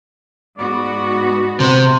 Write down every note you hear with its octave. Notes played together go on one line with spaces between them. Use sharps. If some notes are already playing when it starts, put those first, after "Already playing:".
G#2 B3 F#4 D5
C3 C4 C5